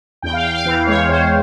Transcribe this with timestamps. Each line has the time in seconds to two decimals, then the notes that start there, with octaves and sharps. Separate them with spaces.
0.22 E2 G5
0.33 F5
0.43 E2 G5
0.55 F5
0.66 E3
0.87 G#3 C#5
1.09 E2 C5